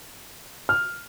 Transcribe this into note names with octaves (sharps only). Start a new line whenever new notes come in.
F6